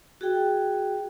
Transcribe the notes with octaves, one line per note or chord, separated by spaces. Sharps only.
F#4 G#4 G5